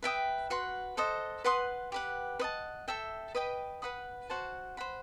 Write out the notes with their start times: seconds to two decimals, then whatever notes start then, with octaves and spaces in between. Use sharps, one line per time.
0.03 B4 E5 G5 D#6
0.50 F#4 B4 F#5 C6
0.97 A4 C5 D#5 F#5
1.44 B4 F#5 C6 D#6
1.92 G4 B4 F#5
2.39 B4 D#5 F#5 A5
2.88 A4 E5 G5
3.35 B4 D#5 G5 B5
3.82 B4 F#5 B5 D#6
4.29 F#4 C5 F#5 A5
4.77 C5 F#5 B5